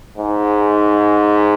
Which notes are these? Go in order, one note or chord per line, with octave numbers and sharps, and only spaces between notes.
G#2